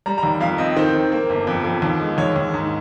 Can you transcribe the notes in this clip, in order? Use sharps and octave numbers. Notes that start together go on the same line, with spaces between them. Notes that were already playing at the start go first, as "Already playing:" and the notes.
G3 A#5
A#5
D#2
F2 F5
C4 D#5
D#3 C5
D#3
A#3
G1
F2
F2
D#2
G#3
D#2 C#5
D#2
G#2